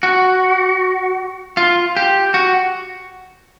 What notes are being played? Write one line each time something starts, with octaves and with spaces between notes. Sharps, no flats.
F#4
F4
G4
F#4